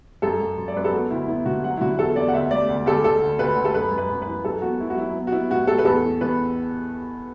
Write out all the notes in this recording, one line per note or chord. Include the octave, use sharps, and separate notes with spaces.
F#2 A4
F#2
F#2
D5
F#2 B4
A4
B3 F#4
D2 E4
B3 E4
D3 F#4
F#3 F#5
E4
D3 F#4
E2 A4
E2 D5
F#5
D2 E5
A3 D5
D2
D2 A4
D2 A4
D2
D2 B4
D2
A4
F#2 B4
F#2
B4
F#2
E3 B4
F#2 A4
B3 F#4
F#3 E4
F#4
F#3 E4
B3
F#4
B3 E4
A2 F#4
A2 A4
B4
E2 A4
E3
E2 B4